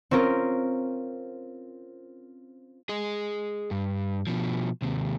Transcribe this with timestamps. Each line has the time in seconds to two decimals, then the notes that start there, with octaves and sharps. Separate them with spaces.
0.11 C4 C#4 F4 A#4
2.89 G#4 D#5
3.71 G2
4.27 B2 F3
4.82 D#2 C3